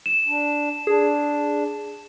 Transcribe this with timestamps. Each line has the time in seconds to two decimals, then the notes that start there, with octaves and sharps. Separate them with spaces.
0.06 E7
0.27 D4
0.87 D4 G#4